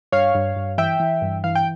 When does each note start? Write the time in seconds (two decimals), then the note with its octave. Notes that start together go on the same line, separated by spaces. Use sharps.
0.12 G2 C#5 F5
0.35 G2
0.56 G2
0.78 E3 E5 G5
1.00 E3
1.22 G2
1.44 E3 F5
1.55 G5